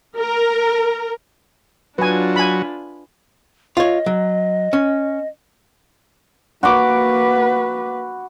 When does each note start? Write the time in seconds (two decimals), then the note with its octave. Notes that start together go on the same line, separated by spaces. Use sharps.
0.16 A#4
1.98 F#3 D4 F4 B4 G#5
2.36 G#5 B5
3.77 F4 C#5 D#5
4.06 F#3
4.73 C#4
6.63 A#3 F#4 B4 B5 D6